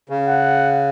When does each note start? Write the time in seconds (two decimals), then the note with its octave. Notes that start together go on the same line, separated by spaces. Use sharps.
0.09 C#3
0.26 F#5